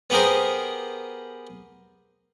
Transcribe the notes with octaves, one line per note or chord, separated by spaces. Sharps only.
B3 G4 G#4 A#4 C5